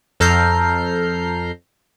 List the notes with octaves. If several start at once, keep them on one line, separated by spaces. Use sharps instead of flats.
F2 A4 A#5 F6 G6 C7